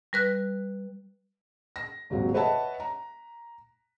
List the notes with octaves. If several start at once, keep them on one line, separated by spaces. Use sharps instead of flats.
G3 B4 F#6
A#6
G#1 D#2 C3 F#3
B4 C#5 D#5 E5 F#5 A5
A#5